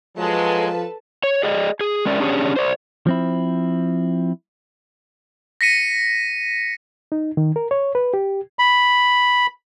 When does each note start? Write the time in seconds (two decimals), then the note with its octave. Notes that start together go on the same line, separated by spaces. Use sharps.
0.17 F3 F#3 G#3 A4 B4 A5
1.24 C#5
1.43 G#4 D5 D#5
1.81 G#4
2.05 G#3 C#4 A#4 D5 E5
2.20 C#4 D4 G4 G#4 C#5
2.56 C5 D5
3.07 F3 C4 E4
5.61 A#6 B6 C#7 D#7
7.12 D#4
7.37 D#3
7.56 A#4
7.71 C#5
7.95 B4
8.14 G4
8.59 B5